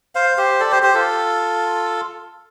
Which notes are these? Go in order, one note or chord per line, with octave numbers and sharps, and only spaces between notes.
C5 F5
G4 C5
A4 D5
G4 C5
G4 C5
F4 A4